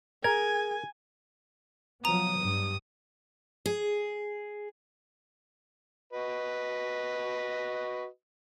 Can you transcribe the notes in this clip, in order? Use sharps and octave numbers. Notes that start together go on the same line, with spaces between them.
G#4 A#4 G#5 G#6
F3 F#3 B3 A#5 D#6
G2
G#4
F#4 B4 D#5